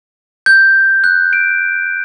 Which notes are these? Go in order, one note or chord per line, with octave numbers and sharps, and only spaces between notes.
G6
F#6
D7